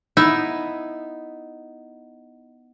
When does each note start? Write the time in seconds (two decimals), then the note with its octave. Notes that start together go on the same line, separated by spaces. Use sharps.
0.17 B3 D#4 E4 E5